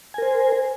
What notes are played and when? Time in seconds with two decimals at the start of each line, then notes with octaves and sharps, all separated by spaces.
0.14 G#5
0.18 A#4
0.22 C5